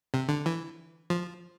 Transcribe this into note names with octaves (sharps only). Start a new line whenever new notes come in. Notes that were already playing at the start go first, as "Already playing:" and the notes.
C3
D3
E3
F3